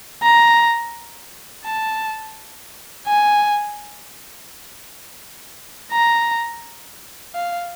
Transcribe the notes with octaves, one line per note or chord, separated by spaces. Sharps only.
A#5
A5
G#5
A#5
F5